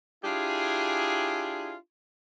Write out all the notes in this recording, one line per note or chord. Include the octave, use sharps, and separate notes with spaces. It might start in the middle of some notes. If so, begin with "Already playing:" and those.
D4 E4 F4 G4 G#4